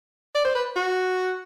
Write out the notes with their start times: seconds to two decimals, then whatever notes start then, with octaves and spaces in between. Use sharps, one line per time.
0.35 D5
0.45 C5
0.55 B4
0.76 F#4